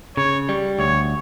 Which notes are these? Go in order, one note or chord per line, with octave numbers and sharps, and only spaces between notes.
C#3 C#5
G3
D2 C#5